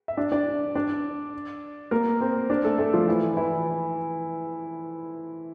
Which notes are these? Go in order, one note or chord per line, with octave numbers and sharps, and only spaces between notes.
E5
D4 D5
D4 D5
D4 D5
A#3 A#4
C4 C5
D4 D5
A3 A4
A3 A4
F3 F4
E3 E4
E3 E4